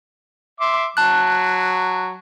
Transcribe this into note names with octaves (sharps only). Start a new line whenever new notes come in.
E5 C6 D6
F#3 A5 F#6